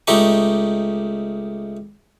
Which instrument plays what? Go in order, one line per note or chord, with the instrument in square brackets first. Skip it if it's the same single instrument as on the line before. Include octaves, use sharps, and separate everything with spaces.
[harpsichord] C#2 A3 D#4 G4 C#6